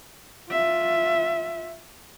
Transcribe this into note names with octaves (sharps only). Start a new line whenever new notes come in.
F4 E5